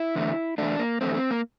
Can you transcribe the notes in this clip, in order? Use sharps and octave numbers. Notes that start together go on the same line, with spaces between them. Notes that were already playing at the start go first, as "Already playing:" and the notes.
Already playing: E4
E2 D3 A3
E2 D3 A3 D4
A#3
E2 D3 A3 C4
C4
A#3